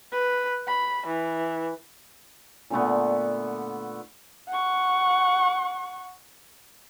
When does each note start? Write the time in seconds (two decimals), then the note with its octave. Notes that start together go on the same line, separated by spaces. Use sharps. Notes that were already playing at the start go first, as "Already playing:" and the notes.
0.12 B4
0.67 B5
1.07 E3
2.70 A#2 D3 A3 B3
4.48 F#5 C#6